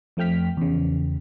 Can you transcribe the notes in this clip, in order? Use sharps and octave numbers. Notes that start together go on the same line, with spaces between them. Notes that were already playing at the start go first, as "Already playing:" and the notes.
F2 F3 A3 G5 F6 B6
E2 C#3